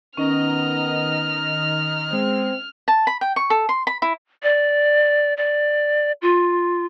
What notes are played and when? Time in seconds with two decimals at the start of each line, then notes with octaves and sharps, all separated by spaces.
0.17 D#3 B3 C#4 D#5 A#5 F6
2.12 G#3 C4
2.88 A5
3.07 B5
3.21 G5
3.36 C#6
3.50 A4
3.69 C6
3.87 B5
4.02 E4
4.43 D5
5.37 D5
6.22 F4